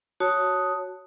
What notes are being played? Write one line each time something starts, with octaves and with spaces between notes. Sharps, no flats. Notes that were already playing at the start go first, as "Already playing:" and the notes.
F#4 C#5 A5 D#6